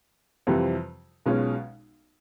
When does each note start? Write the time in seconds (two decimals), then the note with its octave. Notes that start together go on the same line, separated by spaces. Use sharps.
0.47 F2 C3 E3 G3 C4
1.26 B1 B2 G#3 C#4 F4